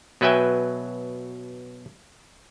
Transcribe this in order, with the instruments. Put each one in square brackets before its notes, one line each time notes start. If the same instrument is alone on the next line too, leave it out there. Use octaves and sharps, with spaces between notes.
[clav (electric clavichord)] B2 F#3 B4 E5 G5 G#5